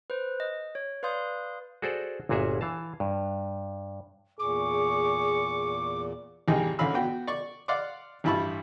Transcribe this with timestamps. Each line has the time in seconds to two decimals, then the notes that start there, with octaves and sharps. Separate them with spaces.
0.10 B4 C5
0.40 D#5
0.75 C#5
1.03 B4 D5 F5 C6 D#6 G6
1.82 F#4 G#4 A4 C5 D5
2.29 G1 A#2 F#4 G#4 E5
2.61 E3 F5 A5
3.00 G2
4.39 E2 A#2 G#4 C#6 D6
6.48 A1 E2 G3 D#4 G#4 G5
6.79 A1 D3 C#4 F5 B5 E6
6.94 B3 F#4 G5
7.27 D5 C#6
7.68 D5 F5 F#5 C6 D6
8.24 A1 G2 E4 A5 B5 C#6